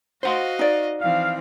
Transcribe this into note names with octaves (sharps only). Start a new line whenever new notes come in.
F#4 C5 D#5 F5 F#5 C6
D#4 D5
E3 F3 C4 F5